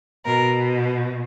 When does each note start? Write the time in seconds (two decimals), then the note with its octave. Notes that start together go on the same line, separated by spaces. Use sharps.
0.25 B2 A#4